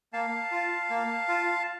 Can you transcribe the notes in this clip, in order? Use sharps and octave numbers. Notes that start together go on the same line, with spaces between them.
A#3 F5 A5
F4
A#3
F4